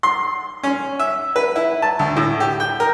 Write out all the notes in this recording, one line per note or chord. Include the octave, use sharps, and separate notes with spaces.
C6
C#4
E5
B4
E4
A5
D2
A2
G4
G5
A#4